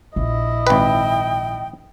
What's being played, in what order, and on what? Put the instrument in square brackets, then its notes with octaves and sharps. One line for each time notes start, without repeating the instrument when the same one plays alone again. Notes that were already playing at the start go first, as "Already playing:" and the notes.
[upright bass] A#1 [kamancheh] E4 D#5
[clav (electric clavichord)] G#1 B4 [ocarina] G5